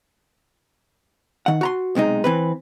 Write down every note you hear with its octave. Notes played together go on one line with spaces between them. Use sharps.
D#3 F#5
F#4 A#5 C6
B1 C3 G#3 D#4
E3 C4 B4